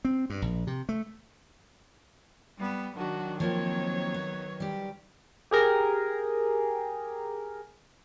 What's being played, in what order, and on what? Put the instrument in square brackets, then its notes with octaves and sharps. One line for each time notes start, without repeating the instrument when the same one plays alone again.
[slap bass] C4
G2
A#1
C3
A3
[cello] G3 B3
[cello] D#3 F#3 [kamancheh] D4 F#4
[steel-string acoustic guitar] F3 A#3 C4 [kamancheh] C#5
[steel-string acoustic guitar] B3
G3 G4
[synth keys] G4 G#4 A#4